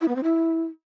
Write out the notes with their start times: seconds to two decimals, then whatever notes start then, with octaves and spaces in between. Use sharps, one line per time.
0.01 E4
0.08 B3
0.16 C4
0.23 E4